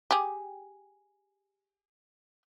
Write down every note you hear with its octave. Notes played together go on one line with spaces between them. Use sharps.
G4 G#4